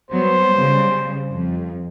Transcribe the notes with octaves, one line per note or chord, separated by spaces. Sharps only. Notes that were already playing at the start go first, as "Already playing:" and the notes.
F#3 G3 B3 C5
C#3 G3
F2